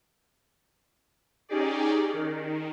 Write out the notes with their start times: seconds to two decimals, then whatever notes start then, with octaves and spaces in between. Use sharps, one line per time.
1.49 C#4 D#4 G4 G#4 D5
2.13 D#3